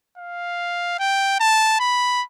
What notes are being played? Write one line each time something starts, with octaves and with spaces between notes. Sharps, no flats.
F5
G5
A5
B5